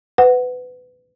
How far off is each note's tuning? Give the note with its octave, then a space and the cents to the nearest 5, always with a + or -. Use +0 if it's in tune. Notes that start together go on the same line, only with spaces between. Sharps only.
B4 +25 F#5 +0